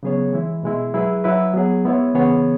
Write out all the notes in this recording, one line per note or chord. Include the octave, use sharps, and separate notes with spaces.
C#3 F#3 B3 G#4 C#5
E3 G#3 E4
B2 G#3 E4
F#3 E4 G#4 B4
F#3 E4 B4
F#3 B3 G#4
G#3 B3 E4 C#5
C#3 E3 B3 G#4 C#5